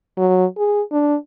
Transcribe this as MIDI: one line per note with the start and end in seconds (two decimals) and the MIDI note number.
0.17 0.46 54
0.58 0.82 68
0.92 1.15 62